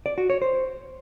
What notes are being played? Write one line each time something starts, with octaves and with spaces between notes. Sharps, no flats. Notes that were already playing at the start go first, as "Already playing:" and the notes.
D5
F#4
C#5
C5